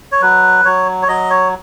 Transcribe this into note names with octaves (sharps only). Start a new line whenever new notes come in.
C#5
F#3 B4
F#3 C#5
C#5
F#3 D#5
C#5